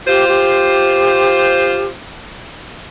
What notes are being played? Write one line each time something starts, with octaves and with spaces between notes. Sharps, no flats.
F4 G4 C5
G4